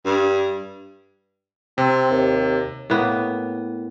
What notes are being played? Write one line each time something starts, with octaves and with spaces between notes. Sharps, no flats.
G2
C3 C4
D#2
A2 A#3 B3